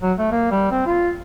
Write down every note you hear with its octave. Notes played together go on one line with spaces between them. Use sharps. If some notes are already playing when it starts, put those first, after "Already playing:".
F#3
A3
A#3
G3
C4
F4